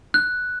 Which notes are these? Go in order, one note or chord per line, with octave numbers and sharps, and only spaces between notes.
F#6